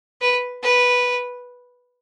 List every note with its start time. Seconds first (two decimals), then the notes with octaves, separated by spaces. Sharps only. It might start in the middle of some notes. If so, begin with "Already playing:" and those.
0.21 B4
0.63 B4